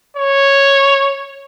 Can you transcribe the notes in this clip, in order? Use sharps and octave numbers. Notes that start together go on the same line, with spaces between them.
C#5